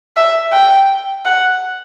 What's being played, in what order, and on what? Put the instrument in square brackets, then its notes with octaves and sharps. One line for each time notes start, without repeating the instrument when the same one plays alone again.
[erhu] E5
G5
F#5